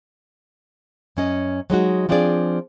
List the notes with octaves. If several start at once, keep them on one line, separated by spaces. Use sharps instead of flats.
F#2 C#4 D#5
F#3 G#3 D#4 F#4
F3 C4 D4 F4 G#4 D5